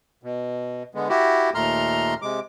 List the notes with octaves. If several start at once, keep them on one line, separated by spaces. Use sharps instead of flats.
B2
D3 G#3 B3
E4 F#4 G4
D#2 A#2 A3 A#5 C6 F6
C3 G#3 D6